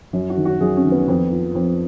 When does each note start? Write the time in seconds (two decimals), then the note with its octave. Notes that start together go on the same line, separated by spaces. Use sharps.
0.13 F#2
0.30 F#4
0.37 D#3
0.45 F#4
0.61 F#2 G#4
0.77 C#4
0.84 D#3
0.92 B3
1.08 F2
1.31 F3
1.55 F2